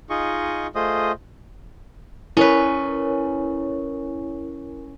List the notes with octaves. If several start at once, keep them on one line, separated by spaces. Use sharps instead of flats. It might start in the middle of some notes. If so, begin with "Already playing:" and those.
D#4 F4 G#4 D#5 C#6
A3 F4 G#4 C5 D#5 D#6
C#4 E4 A#4 B4 C#5